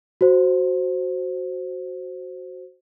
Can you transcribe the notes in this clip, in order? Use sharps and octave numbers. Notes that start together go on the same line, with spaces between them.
F#4 C5